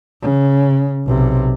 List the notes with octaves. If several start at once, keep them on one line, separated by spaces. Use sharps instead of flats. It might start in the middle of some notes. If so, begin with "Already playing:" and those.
C#3
B1 C3